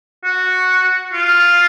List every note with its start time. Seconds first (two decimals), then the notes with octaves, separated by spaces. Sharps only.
0.24 F#4
1.13 F4